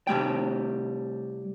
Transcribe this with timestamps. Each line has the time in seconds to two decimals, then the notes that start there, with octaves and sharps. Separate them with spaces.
0.07 C3 G3 A3 G5